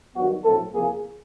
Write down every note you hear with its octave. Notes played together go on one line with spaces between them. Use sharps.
G2 D#3 F#3 B3 F#4
A#1 A2 F#3 A3 C4 A4
E2 C3 F3 A#3 G#4